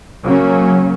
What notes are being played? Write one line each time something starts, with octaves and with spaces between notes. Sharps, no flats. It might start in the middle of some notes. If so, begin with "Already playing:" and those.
C#3 F#3 A#3 C#4